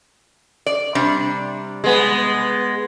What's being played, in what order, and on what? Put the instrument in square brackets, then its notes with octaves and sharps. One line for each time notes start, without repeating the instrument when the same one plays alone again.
[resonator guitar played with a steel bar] D5
C3 G3 D4
[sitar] G#3 B3